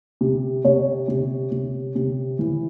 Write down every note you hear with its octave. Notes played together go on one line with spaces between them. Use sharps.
C3
C3 C#5
C3
C3
C3
E3